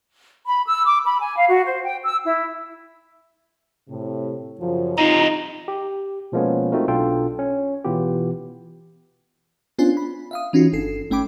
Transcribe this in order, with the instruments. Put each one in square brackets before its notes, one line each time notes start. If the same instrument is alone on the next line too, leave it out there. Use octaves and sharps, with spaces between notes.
[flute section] B5
E6
D6
B5
G#5
F5
F#4
C5
G5
E6
E4
[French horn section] A2 C3
F#2 C#3 F3
[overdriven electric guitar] C4 D#5 [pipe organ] D#4 [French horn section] F4 G4
[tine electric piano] G4
B2 F3 G#3 A#3 B3 C#4
A3 C4 D#4 F4 F#4 A#4
B1 B2 D4 F4 A4 G5
C#4
B2 E3 B3 F4 G4
[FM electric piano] B3 C#4 D4 F4 C5 G#5
B5
E5 F5 D#6
E3 C#4 D#4 F4 F#4
G1 A4 C7
G#1 A3 C#4 G5 B5 D6